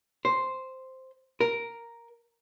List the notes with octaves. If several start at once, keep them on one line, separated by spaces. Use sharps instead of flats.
C5
A#4